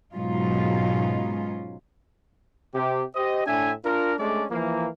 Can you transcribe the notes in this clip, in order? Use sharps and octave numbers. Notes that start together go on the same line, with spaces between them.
G#2 B2 F#3 C#4 D#4 F4
C3 G4
G4 C5 D#5
A2 D4 E5 G#5
D4 F4 A#4
G#3 A3 C#4 D4 D5
E3 F3 A#3